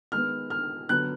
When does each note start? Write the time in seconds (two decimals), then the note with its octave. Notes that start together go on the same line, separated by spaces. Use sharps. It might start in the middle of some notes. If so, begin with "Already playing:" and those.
0.12 D#3 G#3 B3 F6
0.50 F6
0.89 D3 F#3 B3 F#6